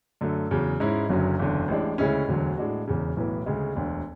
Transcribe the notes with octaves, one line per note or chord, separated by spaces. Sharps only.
F#2 D3 A3
E2 C#3 F#3
G#2 G#3 C#4 E4
F#1 F#2 D3 F#3 C#4
F#1 E2 D3
A1 A2 G#3 D4
D2 C#3 G#3 C#4 E4
E1 D2 D3 F#3
A2 G#3 D4 F#4
E1 E2 C#3
B1 A2 E3 B3
D2 C#3 G#3
E1 D2 D3